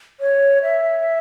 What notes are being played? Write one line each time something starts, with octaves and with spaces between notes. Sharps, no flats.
C#5
E5